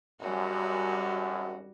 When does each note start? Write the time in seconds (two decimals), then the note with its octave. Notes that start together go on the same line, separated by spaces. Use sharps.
0.20 G#1 F#2 G3 F#4